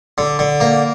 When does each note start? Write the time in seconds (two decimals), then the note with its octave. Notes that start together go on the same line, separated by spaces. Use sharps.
0.18 D3
0.39 D3
0.60 A#3